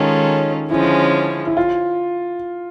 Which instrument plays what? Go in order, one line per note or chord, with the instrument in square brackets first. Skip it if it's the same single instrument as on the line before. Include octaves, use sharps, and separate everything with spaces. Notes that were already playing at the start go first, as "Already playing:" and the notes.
Already playing: [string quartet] D#3 G#3 C#4 F4 A4 [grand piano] D#4
[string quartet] D3 F3 G#3 C#4 [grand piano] E4
[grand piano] E4
F4